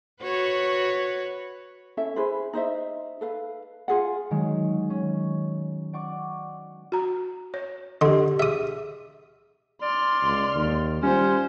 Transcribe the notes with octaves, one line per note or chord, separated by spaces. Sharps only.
F#4 B4 C#5
C#4 E4 A4 E5
E4 G#4 B4 C5
D#4 C5 D#5 E5
A4 B4 F5
F4 G#4 F#5
D#3 F#3 G#3
C#4
D5 F#5 C#6 D6
F#4 A#5
C#5
D3 G4 D#5 C6
G#4 E5 D#6
D5 C6 F6
C#2
D#2
G3 C#4 F4 C5